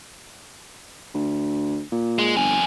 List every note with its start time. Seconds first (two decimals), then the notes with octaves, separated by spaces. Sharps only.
1.14 D2
1.92 A#2
2.19 G#3
2.36 G1 F2 G#5